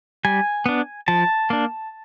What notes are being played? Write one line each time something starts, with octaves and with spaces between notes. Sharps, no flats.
G3 G#5
B3 D4
F3 A5
A#3 D4